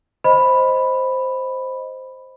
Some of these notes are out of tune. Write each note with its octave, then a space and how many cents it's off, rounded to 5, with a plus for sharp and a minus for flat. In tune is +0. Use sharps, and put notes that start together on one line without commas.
C5 +0 D#5 +0 B5 +0